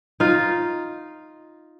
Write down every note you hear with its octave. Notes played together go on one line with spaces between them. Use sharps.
D#4 F4